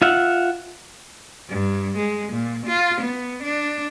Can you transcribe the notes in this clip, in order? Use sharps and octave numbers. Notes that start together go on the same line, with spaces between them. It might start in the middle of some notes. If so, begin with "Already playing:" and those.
F4 E5 F#5
G2
G#3
A#2
F4
B3
D4